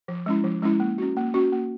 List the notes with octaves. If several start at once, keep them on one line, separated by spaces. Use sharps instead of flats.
F3
G#3 C#4 E4
F3
G#3 C#4 E4
A#3
C#4 F#4
A#3
C#4 F#4
A#3